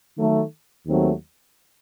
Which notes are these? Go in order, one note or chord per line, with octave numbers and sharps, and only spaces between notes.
D#3 F#3 A3
D#2 D#3 F#3 A3 C4